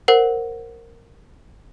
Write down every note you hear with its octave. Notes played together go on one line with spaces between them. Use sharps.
A#4 C5 F#5